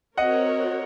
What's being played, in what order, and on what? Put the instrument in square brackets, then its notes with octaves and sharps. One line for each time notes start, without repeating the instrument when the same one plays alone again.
[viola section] C4 F#4 A#4 C#5 [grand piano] D#5 F#5